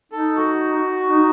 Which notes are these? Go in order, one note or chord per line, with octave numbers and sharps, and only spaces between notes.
D#4 A4
F#4
D#4